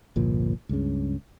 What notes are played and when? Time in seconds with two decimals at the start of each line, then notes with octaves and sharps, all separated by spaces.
0.16 G1 C2 A#2 F3
0.69 C#2 G2 C#3